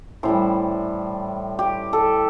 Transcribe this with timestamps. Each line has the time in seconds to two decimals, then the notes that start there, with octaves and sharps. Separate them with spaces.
0.23 A2 E3 G3 C5
1.59 G4
1.93 A4